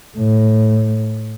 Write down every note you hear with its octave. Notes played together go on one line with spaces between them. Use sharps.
A2